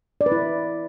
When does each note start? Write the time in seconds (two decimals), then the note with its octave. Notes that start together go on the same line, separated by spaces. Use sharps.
0.21 D5
0.26 B4
0.32 E4